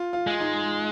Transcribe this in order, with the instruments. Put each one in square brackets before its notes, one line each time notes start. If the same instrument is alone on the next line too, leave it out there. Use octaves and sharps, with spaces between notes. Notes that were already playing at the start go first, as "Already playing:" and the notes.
Already playing: [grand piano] F4
F4
[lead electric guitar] G#3 [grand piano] F4
[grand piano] D#4